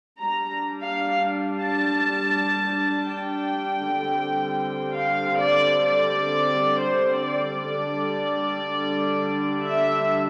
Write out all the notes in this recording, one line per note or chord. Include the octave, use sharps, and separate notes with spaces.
G3 D4 A#5
F5
A5
G5
D3 G3 C4
F5
D5
D5
C5
D5
D3 G3 D4
E5